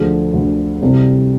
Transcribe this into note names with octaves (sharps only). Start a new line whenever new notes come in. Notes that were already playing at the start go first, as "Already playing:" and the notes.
Already playing: D2 D3 F3 G#4
D2 D3 F3
C2 C3 G3